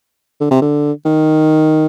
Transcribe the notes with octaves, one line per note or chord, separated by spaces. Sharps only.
D3
C3
D3
D#3